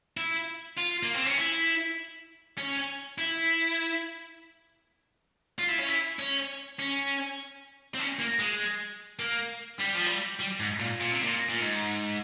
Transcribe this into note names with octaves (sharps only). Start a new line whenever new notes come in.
E4
F4
A#3
C4
C#4
E4
C#4
E4
F4
E4
C#4
E4
C#4
C#4
C4
C#4
A#3
G#3
A#3
G3
F3
G3
G3
G#2
A#2
A#2
C3
A#2
A#2
G#2